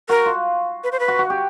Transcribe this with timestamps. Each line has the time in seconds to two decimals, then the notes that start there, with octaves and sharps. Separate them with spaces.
0.09 F#4 A#4
0.26 F4
0.84 B4
0.92 C5
1.00 B4
1.08 F#4
1.19 F#4
1.30 G4